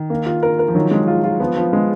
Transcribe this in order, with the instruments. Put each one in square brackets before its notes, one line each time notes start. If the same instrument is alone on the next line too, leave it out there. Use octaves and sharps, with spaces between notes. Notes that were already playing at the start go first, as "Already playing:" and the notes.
Already playing: [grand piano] D#3
[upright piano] A#3
F4
A#4
A#4
[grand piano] F3
[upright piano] D#3 [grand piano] F#3
[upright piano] G#3
F4
F4
[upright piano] F3 [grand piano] B3
[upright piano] F3
G#3